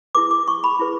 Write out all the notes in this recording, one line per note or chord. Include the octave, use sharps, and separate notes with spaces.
E4 G#4 B4 D6
D6
C#6
B5
E4 G#4 B4